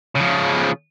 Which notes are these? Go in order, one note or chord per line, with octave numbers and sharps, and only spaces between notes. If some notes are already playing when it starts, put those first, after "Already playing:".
C#3 F3